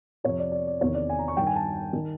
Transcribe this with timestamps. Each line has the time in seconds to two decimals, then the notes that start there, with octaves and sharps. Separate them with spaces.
0.24 F2 C3 F3 C#5
0.39 D5
0.52 D5
0.67 D5
0.81 E2 C3 D#3 C#5
0.94 D5
1.09 G#5
1.19 A#5
1.28 C#6
1.37 G2 D#3 G5
1.47 G#5
1.56 A5
1.93 D#3